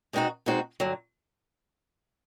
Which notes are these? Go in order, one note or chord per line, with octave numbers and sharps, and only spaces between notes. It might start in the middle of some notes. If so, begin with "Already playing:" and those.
B2 G#3 C4 D#4 F#4
B2 G#3 C4 D#4 F#4
G2 D3 F#3